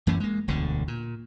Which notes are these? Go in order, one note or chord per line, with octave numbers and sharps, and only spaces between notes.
F#2 E3 A3 C#4
G#3 A#3
E1 D2 B2 D3
A#2